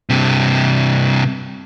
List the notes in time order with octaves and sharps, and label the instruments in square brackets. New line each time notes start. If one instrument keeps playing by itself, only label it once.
[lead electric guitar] G2 C3